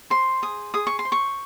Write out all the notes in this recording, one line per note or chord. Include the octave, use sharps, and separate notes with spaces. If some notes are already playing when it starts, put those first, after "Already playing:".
C5 C6
G#4 D#6
G#4 D#6
C#6
C6
C5
C#6